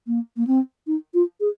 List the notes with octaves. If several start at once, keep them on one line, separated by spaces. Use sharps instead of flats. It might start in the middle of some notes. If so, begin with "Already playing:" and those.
A#3
A#3
C4
D#4
F4
G#4